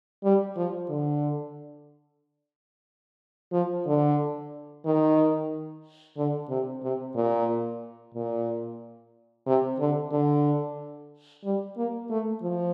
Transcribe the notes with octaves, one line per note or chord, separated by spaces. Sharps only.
G3
F3
D3
F3
D3
D#3
D3
C3
C3
A#2
A#2
C3
D3
D3
G3
A#3
A3
F3